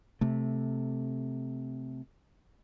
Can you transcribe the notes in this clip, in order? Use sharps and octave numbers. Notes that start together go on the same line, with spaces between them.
C3 A3